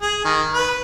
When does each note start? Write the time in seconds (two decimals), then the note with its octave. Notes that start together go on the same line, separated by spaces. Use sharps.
0.02 G#4
0.25 D#3
0.53 B4